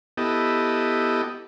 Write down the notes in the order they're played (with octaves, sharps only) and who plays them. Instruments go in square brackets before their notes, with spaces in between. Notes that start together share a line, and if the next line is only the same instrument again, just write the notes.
[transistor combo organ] B3 E4 G4 A4 D#5